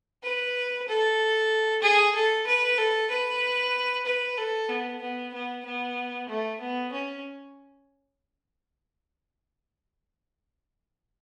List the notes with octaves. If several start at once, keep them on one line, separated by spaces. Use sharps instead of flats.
B4
A4
G#4
A4
B4
A4
B4
B4
A4
B3
B3
B3
B3
A3
B3
C#4